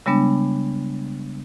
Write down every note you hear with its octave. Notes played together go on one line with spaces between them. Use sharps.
C#3 G3 G#3 B3 D4